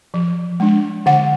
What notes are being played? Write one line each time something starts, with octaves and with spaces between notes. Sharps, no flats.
F3
G#3 D4
D3 F#5